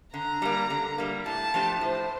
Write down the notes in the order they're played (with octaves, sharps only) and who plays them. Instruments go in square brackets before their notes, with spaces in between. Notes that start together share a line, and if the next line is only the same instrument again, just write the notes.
[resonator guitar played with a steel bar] D3 [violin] A#5
[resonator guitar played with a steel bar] G3 A#3
D3
G3 A#3
[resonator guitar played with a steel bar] A2 [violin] A5
[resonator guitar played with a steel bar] F3 A3 D4 G4
[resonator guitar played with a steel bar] A2 [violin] C5